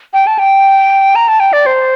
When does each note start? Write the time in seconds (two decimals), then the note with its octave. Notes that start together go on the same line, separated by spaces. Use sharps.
0.13 G5
0.27 A5
0.39 G5
1.16 A#5
1.28 A5
1.40 G5
1.53 D5
1.66 C5